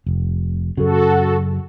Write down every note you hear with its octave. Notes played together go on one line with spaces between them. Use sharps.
F1
F#2 C#3 F#4 A4